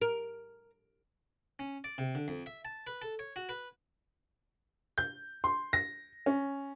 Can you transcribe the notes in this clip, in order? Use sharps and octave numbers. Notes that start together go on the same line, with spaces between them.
A#4
C#4
D5
C3
D3
F2
E5
A5
B4
A4
C#5
F#4
B4
G6
C6
A#6
C#4